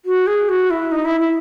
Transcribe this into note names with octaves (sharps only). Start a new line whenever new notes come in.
F#4
G#4
F#4
E4
D#4
E4
E4